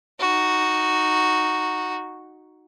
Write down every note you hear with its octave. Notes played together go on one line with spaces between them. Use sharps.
D#4 F#4